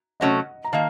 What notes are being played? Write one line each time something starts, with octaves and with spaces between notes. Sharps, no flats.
C3 F#3 A3 C#4 D#5 F#5
A#5
D#3 A#3 F5 A5